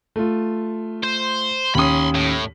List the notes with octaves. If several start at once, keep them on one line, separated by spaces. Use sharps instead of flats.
A3 F4
C5
D#2 C#4 B5 C6 D#6
A2